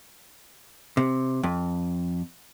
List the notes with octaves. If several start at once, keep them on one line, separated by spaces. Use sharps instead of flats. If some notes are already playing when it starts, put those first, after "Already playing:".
C3
F2